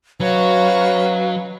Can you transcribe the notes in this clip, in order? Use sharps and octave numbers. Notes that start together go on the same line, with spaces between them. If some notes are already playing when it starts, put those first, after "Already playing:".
F#3 C#4 D#4 F#4 B4 C#5 F5